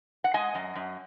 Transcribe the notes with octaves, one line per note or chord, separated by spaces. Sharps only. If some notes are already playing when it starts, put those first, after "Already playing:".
F#5
G#3 D#5 G#5
F#2
F#2